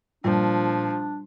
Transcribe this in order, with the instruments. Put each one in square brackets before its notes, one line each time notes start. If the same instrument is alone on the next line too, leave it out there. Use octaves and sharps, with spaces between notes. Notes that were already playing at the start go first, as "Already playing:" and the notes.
[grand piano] A#2 [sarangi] F3 [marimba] G3 [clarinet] D4